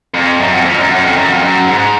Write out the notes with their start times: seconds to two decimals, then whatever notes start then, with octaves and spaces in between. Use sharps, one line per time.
0.14 F2
0.40 F#2
0.52 F2
0.65 F2
0.78 F#2
0.91 F#2
1.04 F2
1.16 F#2
1.29 F2
1.42 F#2
1.67 G#2